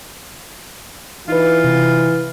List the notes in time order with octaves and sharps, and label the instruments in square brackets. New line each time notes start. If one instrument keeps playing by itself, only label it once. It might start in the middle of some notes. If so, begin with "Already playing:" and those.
[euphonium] E3 [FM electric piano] D#4 B4 [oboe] F4
[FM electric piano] C3